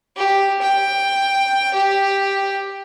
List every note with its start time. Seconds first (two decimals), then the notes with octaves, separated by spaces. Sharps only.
0.16 G4
0.62 G5
1.74 G4